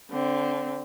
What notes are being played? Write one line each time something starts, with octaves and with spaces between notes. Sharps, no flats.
D3 C4